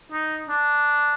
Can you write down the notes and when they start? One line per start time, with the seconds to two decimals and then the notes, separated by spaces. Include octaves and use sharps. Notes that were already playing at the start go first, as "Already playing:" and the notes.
0.12 D#4
0.49 D4